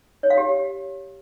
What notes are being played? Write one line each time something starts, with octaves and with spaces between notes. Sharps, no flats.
C#5
F5
G4